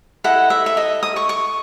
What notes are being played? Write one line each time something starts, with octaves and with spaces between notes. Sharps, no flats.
E4 A4 D#5 F#5
E5
E5
D#5
D#6
C#6
C#6